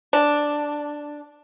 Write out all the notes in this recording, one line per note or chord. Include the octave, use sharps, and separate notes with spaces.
D4